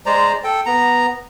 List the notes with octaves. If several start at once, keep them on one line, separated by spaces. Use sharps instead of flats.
G#3 C5 D5 A#5
A4 G5
B3 A#5